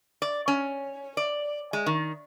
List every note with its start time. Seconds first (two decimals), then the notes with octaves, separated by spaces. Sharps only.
0.22 D5
0.48 C#4
1.17 D5
1.73 G#3
1.86 D#3